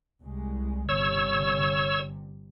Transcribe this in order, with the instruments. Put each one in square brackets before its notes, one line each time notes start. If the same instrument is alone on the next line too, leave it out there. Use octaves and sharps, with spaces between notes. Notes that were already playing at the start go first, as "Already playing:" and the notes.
[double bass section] C2 G#3
[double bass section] G1 C3 [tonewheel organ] C#5 E6